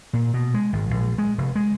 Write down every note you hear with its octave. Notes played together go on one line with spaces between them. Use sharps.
A#2
B2
G#3
G#1
A#1
G#3
F1
G#3